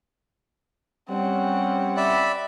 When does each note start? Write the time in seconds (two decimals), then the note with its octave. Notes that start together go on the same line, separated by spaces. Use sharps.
1.09 G3 C4 C#4 F#5
1.97 D5 E5 B5